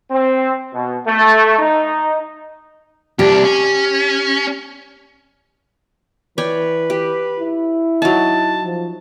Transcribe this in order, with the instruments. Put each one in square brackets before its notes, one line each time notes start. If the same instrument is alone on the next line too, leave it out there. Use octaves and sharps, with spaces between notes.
[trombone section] C4
B2
A3
D#4
[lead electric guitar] C2 D4 [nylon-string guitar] G4
[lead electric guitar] C#4
[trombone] E3 [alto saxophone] B4 [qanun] C#5 D5 G5
[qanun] G4
[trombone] E4
[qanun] F#3 D#4 [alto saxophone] A5
[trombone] F3